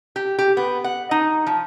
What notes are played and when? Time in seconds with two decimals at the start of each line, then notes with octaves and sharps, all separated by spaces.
0.16 G4
0.39 G4
0.57 B3
0.84 F#5
1.11 D#4
1.47 F3